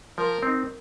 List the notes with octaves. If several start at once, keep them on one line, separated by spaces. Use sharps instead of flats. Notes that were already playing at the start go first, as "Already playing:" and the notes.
F3 A#4
C4 D#4